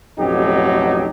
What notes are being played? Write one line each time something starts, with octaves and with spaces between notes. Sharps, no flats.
A1 F2 B2 F#3 D#4 G4